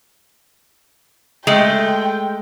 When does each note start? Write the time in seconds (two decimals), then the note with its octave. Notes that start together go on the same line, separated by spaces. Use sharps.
1.47 G#3 A3 G5